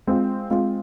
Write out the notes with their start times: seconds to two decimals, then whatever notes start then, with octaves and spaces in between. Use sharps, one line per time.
0.07 G#3 C4 F4
0.50 G#3 C4 F4